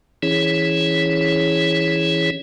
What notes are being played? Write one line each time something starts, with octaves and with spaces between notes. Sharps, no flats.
E3 C#4 E4 G#4 C#5